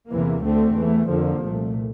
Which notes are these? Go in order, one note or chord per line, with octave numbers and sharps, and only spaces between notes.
E2 C3 E3 A#3
D2 D3 A3 C4
E2 E3 A3
F2 D3 F3 A#3
C2 A#2 A3